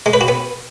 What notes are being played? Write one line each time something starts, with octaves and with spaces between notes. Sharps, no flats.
G#3
B4
F#4
B3